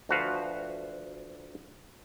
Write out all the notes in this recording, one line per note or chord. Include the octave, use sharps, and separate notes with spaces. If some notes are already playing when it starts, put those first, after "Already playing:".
D2 F3 F#4 B4 F5